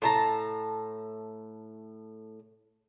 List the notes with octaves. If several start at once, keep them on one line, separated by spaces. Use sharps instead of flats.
A2 A5 A#5